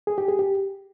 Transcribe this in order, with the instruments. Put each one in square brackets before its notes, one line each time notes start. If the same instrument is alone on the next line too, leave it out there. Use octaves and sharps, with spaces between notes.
[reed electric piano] G#4
G4
G#4
G4